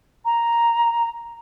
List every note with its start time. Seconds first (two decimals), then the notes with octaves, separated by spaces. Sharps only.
0.25 A#5